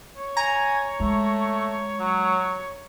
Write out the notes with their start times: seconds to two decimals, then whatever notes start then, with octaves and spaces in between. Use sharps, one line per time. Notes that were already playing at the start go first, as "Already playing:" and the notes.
0.17 C#5
0.37 G#5 A#5
1.00 G#3 A3
2.00 F#3